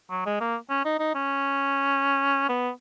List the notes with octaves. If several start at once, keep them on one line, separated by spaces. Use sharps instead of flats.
F#3
G#3
A#3
C#4
D#4
D#4
C#4
B3